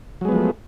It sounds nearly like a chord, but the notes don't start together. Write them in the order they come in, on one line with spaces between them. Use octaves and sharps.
F#3 G#3 B3 F3 A3